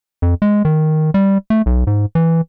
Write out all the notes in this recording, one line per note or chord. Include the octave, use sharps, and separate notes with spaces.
F2
G#3
D#3
G3
A3
B1
G#2
E3